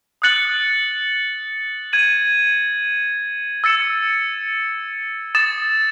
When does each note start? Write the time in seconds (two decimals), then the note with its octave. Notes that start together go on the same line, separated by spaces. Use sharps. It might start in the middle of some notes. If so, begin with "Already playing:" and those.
0.22 D#6 F#6 A6 C#7 F#7
1.93 G#6 D#7 F#7
3.64 E6 A6 C#7 E7
5.35 D#6 A6 E7